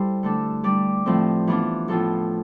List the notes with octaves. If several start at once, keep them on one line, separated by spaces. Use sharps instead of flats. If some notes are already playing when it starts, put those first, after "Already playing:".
Already playing: G3 E4 A4 C5
D3 A3 D4 A4
G3 D4 G4 D5
A2 F3 A3 C4
E3 B3 D4 F4
A2 F3 B3 F4 A4